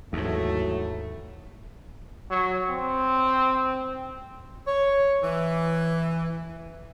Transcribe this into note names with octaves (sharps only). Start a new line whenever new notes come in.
D#2 G#2 E3 F#3 A3
F#3
C4
C#5
E3